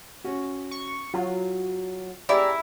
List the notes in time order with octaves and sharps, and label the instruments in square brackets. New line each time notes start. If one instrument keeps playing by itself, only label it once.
[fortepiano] C#4 F#4
[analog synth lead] C#6
[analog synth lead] F#3 [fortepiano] F4
[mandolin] E4 [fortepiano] G4 G#4 E5 [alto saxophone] D5 [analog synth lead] A#5